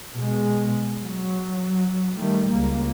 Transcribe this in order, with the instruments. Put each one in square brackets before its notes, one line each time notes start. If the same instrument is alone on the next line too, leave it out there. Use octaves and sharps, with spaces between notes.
[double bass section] B2 G#3
F#3
D#3 G3 A3
C#2 A#3